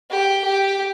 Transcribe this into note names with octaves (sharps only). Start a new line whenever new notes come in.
G4
G4